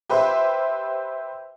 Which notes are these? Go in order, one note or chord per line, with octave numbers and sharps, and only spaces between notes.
G4 B4 C5 E5